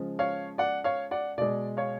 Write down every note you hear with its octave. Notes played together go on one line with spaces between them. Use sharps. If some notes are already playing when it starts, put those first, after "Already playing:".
Already playing: C#3 F3 G#3
C#5 F5
D5 F#5
C#5 F5
D5 F#5
B2 G#3 D5
C#5 F5